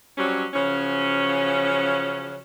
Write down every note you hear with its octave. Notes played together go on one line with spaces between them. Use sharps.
F#3 G3 C4 C#4
C#3 F3 F#3 C#4